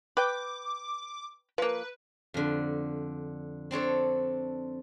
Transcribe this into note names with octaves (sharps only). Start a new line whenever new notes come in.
B4 G5 D6
F3 A#3 B4
F2 D3
C4 D4 A4 C#5